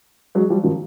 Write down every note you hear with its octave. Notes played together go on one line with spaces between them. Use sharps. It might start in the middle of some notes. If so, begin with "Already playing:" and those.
F#3 G#3
F3 G3
D#3 F3